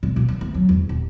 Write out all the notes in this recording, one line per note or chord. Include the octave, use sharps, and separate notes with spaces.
B2
A#3
E3
A3
F#3
E2
D#1